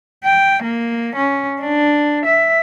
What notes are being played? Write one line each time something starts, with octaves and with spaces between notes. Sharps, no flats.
G5
A#3
C#4
D4
E5